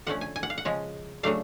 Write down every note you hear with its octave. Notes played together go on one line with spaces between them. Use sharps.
D3 F3 A3 C#4 F#5
G#5
G#5
F#5
F5
F#5
C#3 F3 G#3 C#4
C#3 F#3 A3 D4 F5